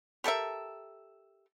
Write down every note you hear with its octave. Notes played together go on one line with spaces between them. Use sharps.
G4 A4 A#4 E5